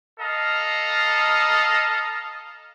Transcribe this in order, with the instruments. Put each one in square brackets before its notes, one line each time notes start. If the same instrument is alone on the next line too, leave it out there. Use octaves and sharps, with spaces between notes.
[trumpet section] A4 D#5 F5 A#5